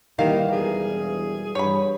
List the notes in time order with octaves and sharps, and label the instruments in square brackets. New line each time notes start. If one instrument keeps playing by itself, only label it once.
[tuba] D#2 [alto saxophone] D#3 [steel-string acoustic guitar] E3 G3 A#4 [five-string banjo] F5
[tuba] E1 [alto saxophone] G#4
[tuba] G2 [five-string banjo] C#5 B5